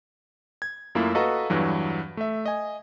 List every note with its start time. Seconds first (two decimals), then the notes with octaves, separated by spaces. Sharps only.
0.62 G#6
0.95 F#2 A3 A#3 E4 F4
1.15 F#4 A4 B4 D#5 F5 A#5
1.50 E2 G2 E3 F#3
2.17 A3 E5
2.46 D#5 G#5